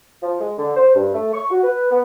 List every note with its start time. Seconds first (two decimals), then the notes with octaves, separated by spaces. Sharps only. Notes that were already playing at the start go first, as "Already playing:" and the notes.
0.22 F3
0.40 G#3
0.58 D3
0.76 C5
0.94 G2
1.14 A3
1.33 C#6
1.50 F#4
1.63 B4
1.91 B3